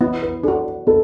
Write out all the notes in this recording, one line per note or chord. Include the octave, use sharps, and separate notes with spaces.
B3 E4
B4
D4 F#4 A4
B3 A4